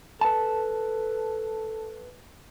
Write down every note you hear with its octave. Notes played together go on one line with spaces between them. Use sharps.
A4 B4 A5